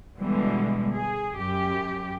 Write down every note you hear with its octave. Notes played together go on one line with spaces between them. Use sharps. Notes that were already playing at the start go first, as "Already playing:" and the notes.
B2 D3 E3 G3 G#3
G#4
F#2 G4